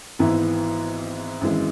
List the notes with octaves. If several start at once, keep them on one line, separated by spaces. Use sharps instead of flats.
G#1 G#2 E3 B3 E4
G#1 F#2 E3 G#3